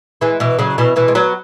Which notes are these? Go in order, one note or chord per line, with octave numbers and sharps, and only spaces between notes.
E3 G#3
B2 E3
C#3 F#3
B2 E3
B2 E3
G#3
F#3 B3